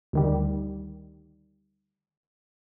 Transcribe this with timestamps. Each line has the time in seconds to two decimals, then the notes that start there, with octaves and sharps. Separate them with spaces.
0.13 D2 D#3 G3